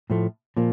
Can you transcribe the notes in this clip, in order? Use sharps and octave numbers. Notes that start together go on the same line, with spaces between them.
A2 F3 A3
A#2 F3 A#3